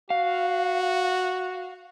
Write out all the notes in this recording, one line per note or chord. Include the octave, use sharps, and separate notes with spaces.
F#4 F5